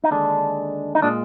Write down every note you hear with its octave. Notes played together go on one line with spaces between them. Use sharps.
D#4
D#2 D3 G#3 D4
D#4
A#2 G#3 D4